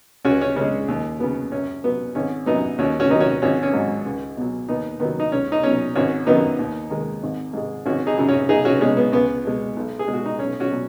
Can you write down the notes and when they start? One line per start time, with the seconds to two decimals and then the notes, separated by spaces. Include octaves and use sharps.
0.25 C#2 C#4 F#4
0.41 C#4
0.56 C#3 G#3 C#4
0.88 D#2
1.20 C#3 F#3 B3
1.52 F#2 C#4
1.84 F#3 B3
2.15 G#1 C#4
2.46 F#2 F#3 B3 D#4
2.78 D#2 C#4 F#4
3.00 C#4 F#4
3.10 D#3 F#3 D#4
3.20 C#4 F#4
3.42 G#1 C#4 F#4
3.63 C#4
3.74 G#2 F#3
4.06 C#2
4.37 B2 F#3
4.69 D#2 B3 D#4
5.00 D#3 F#3 B3
5.20 D#4
5.32 C#2 C#4
5.52 D#4
5.63 B2 F#3 C#4
5.95 G#1 C#4 F#4
6.27 F#2 D#3 F#3 B3 D#4
6.59 D#2
6.90 D#3 G#3
7.23 G#1
7.53 G#2 G#3
7.86 G#1 C#4 F#4
8.07 D#4 G#4
8.18 F#2 C#3 F#3
8.28 C#4 F#4
8.49 B1 D#4 G#4
8.65 C#4 F#4
8.81 B2 G#3 C#4
8.97 B3
9.12 C#2 B3
9.45 B2 G#3
9.76 B1
9.99 G#4
10.07 B2 G#3
10.14 F#4
10.26 D#4
10.39 B1 C#4
10.60 C#4 F#4
10.71 B2 F#3